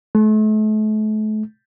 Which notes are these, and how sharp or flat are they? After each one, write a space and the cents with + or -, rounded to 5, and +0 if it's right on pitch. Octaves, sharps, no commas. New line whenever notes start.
A3 -40